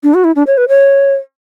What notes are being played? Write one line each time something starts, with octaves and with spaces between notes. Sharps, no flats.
D4
F#4
E4
D4
C#5
B4
C#5